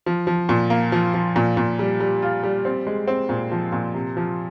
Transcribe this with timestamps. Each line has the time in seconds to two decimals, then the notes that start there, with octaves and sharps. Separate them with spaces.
0.06 F3
0.27 F3
0.49 A#2
0.70 A#3
0.92 F3
1.14 F3
1.36 A#2
1.57 A#2
1.79 G3
2.00 G3
2.22 F4
2.43 G3
2.65 C4
2.87 G#3
3.08 C4
3.29 A#2
3.52 F3
3.72 A#2
3.94 C3
4.17 F3